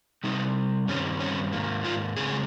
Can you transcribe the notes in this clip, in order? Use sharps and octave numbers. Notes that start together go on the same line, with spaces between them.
C3 G3 C4 D#4
G2 D#3 G3 C4 C#4
C#4
G#2 D#3 A#3
F4
C#3 G#3 C4 G#4